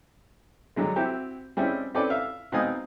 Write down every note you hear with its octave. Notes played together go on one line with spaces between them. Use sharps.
G2 D3 F#3 G#3
C4 E4 F#4 G4
G3 G#3 C4 C#4 E4
C4 C#4 A4 B4 D5
E5 F5
B2 C4 D#4 F5 G#5 D#6